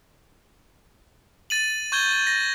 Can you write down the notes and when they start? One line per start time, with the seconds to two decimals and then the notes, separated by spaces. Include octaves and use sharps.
1.50 A6 D#7 F#7
1.92 C#6 G6 G#6 G7
2.13 G6
2.27 A#6